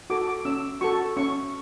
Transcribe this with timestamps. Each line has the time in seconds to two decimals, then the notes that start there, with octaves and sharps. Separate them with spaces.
0.10 F#4 A4 D6
0.28 D6
0.45 C#4 E6
0.81 F#4 A4 C#6
1.17 C#4 C#6